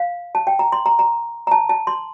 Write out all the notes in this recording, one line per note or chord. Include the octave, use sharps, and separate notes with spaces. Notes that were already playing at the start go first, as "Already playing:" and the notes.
Already playing: F5
A5
G5
A#5
C6
A#5
A#5
A#5
A5
A5
C6